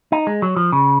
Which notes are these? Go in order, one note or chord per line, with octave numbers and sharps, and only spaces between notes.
D#4
G#3
F#3
F3
C#3